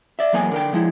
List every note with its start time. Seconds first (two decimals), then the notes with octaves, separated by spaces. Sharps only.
0.19 D5 E5
0.33 E2 F#3 A#3 D#5 G#5
0.51 D3 A#4 G5
0.73 F3 G#3 E4